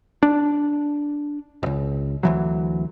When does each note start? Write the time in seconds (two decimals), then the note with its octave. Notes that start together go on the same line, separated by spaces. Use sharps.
0.23 D4
1.63 E1 C#2
2.23 D2 E3 F#3